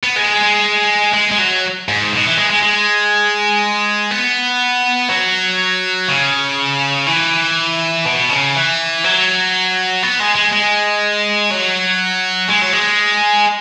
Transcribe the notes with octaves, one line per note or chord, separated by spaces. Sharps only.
B3
G#3
G#3
G#3
F#3
G#2
B2
E3
G#3
G#3
G#3
B3
F#3
C#3
E3
B2
C#3
E3
F#3
B3
G#3
G#3
G#3
F#3
G#3
F#3
G#3